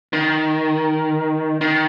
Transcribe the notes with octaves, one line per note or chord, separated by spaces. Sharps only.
D#3
D#3